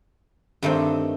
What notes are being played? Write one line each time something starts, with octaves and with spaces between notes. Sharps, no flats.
G2 D#3 A3 C4